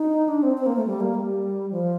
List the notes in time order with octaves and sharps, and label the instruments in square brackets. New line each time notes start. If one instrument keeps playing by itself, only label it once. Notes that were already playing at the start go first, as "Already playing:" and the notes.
Already playing: [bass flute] D#4
D4
C4
C4
A#3
A3
G3
A#3
G3
F3